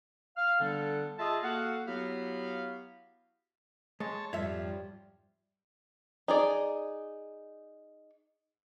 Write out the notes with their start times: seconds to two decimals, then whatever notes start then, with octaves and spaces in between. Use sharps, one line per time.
0.36 F5 F6
0.59 D3 G3 B3 D4 A4 F#5
1.19 F4 G#4 D#5 E5 A5 D#6
1.42 A#3 F#4 A4 F5 F#5
1.86 F#3 B3 E4 F#4 G4 F5
4.00 G#3 C#5 A5
4.33 F2 G#2 G3 C#5 E5
6.28 D#4 G#4 D5